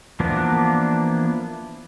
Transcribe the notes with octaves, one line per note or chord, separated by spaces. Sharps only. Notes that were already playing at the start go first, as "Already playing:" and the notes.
E3 F3 A#3 B3 D4